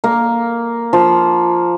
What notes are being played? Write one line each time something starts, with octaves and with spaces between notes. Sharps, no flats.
A#3
F3